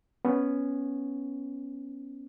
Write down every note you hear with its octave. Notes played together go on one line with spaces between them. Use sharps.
B3 C#4